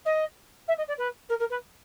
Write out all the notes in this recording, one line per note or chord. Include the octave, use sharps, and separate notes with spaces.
D#5
E5
D#5
D5
B4
A#4
A#4
B4